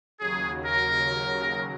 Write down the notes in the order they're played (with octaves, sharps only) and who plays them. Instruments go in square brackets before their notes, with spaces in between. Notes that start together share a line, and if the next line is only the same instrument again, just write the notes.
[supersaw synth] D#2 C#3 F#3 [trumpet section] G#4
[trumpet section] A#4